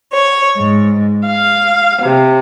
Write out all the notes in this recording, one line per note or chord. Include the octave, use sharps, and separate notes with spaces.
C#5
G#2
F5
C3